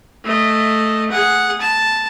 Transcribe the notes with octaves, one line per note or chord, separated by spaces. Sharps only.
A3 D#5
G#4 F#5
A5